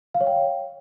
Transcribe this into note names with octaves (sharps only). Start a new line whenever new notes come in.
F5
C#5
G5